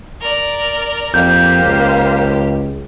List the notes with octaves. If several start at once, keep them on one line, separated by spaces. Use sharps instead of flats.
A#4 D5
F2 A#3 G4 C5 G6
C#2